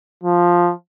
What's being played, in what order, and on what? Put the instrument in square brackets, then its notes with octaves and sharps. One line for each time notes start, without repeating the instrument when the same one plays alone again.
[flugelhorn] F3